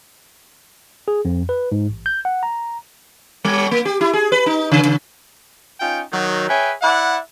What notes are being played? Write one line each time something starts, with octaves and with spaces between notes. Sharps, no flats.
G#4
F2
B4
G#2
A1
G6
F#5
A#5
G3
A#3
G4
E4
G#4
B4
D#4
C#3
C#3
C#4 D#4 F4 G5
D#3 F#3
G#4 B4 C#5 E5 G5
E4 D5 E5 F#5